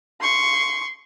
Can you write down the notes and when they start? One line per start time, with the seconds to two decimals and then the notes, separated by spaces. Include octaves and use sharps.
0.21 C6 C#6